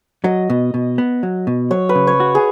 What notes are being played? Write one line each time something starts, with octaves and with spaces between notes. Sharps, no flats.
F#3 D#5
B2
B2
B3
F#3
B2
F#3 C#5
B4
C#3
C#5
F#4
G#4